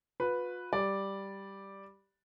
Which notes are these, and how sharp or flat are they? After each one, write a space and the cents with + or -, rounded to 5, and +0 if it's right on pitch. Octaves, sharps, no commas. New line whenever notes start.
F4 +45 B4 +0
G3 +0 D5 +0